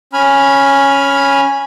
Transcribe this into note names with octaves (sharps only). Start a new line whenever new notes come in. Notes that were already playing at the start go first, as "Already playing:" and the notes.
C#4 G#5 B5 F6